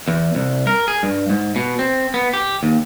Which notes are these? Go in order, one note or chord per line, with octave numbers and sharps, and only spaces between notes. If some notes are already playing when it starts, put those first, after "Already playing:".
E2
C2
A#4
G#4
G2
G#2
B2
C4
B3
G4
D#2